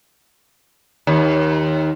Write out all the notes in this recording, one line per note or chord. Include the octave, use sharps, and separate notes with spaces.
D#2